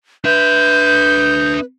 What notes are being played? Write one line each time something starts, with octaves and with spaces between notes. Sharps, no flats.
D4 B4 E5 G6